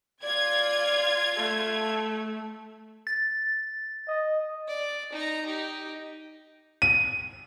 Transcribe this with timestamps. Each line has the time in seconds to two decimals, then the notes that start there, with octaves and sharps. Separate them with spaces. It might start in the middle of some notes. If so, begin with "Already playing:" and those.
0.23 F4 D5 G#6
1.36 A3
3.07 A6
4.08 D#5
4.68 D5
5.13 D#4 A#5
5.46 D#4 G4
6.82 D#7